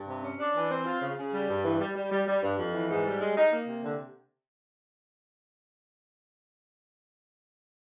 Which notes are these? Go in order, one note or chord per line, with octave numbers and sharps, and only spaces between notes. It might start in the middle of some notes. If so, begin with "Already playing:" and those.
Already playing: G2
C3
C#4
D4
E3
C4
F4
C#3
C#3
G3
G2
E3
G3
G3
G3
G3
G2
F2
E3
G#2
G3
G#3
D#4
A#3
C3
D3